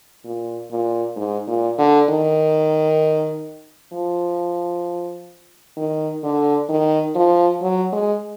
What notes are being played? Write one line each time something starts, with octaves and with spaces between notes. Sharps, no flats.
A#2
A#2
G#2
A#2
D3
D#3
F3
D#3
D3
D#3
F3
F#3
G#3